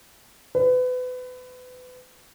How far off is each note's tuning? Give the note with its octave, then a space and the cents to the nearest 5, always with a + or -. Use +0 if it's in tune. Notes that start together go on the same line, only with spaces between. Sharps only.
B4 +30